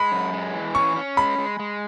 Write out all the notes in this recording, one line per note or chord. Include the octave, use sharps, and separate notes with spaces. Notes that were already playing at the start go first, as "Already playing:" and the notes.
Already playing: G#3 B5
F#2
G#3
E3
C#4 C#6
C#4
G#3 B5
G#3
G#3